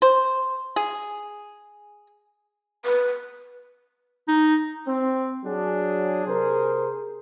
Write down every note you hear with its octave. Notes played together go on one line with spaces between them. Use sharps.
C5
G#4
B4
D#4
C4
F#3 D4 G#4
C3 A#4 C5